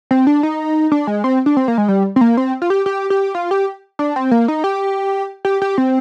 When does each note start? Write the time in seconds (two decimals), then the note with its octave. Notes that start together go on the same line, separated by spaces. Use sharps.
0.11 C4
0.27 D4
0.43 D#4
0.92 D4
1.07 G#3
1.24 C4
1.46 D4
1.57 C4
1.68 A#3
1.78 G#3
1.88 G3
2.16 C4
2.21 A#3
2.37 C4
2.62 F4
2.70 G4
2.86 G4
3.10 G4
3.35 F4
3.51 G4
3.99 D4
4.16 C4
4.31 A#3
4.48 D#4
4.64 G4
5.45 G4
5.62 G4
5.78 C4